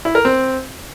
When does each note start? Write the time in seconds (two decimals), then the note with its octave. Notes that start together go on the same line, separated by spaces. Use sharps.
0.05 E4
0.15 A#4
0.25 C4